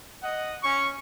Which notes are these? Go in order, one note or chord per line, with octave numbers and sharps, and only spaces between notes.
D#5 F#5
C#4 C#6